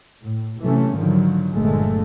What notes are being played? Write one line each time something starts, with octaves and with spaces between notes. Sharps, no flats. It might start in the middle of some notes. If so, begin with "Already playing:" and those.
A2
C3 E3 F#3 A3 C#4
G#2 D3 D#3 F3 F#3
G1 A#2 D3 F3 G#3 A3